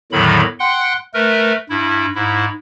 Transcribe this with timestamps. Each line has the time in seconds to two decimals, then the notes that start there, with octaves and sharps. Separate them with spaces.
0.12 E2 A2 D3 D#3 F#3 B5
0.60 F#5 G5 C6 F#6
1.14 A3 A#4 B4
1.70 G2 E4
2.15 G#2 E4